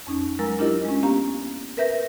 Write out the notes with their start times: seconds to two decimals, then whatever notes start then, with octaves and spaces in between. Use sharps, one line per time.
0.07 F2 C#4 D#4
0.39 F#3 G#3 A#4 A#5 E6
0.59 D4 E4 F4 G4 A#4 D#5
0.85 G#3 C#4
1.03 A#3 B3 C#4 G4 F5 A#5
1.77 A#4 B4 E5 G6 A#6